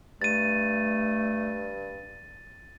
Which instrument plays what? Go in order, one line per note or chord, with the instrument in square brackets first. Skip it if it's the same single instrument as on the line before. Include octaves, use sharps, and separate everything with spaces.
[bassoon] G2 [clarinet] A3 [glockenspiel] A6 D#7